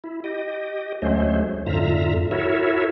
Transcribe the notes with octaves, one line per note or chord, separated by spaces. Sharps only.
E4
G4 D#5
D2 F#3 G#3 A3 C#4 C5
F2 G#2 D3 F4 E5 A#5
E4 F#4 A4 A#4 C#5 E5